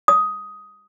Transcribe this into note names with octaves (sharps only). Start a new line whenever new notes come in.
D#6